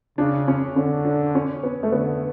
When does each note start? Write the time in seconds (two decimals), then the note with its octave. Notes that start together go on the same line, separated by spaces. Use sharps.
0.18 C#3 D4
0.48 C#4
0.76 D3 C#4
1.05 D4
1.35 C#4
1.63 B3
1.83 A3
1.92 D3 B3